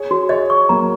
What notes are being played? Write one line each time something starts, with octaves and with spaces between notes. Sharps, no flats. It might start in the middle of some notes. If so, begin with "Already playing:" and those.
Already playing: G#4 C#5
F#4
G#4 C#5 D#5
C#6
F#3 A#3 A#5